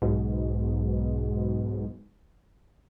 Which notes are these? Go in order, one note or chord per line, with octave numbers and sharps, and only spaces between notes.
B1 G#2 B2